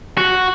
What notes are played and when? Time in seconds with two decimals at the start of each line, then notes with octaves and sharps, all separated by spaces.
0.18 F#4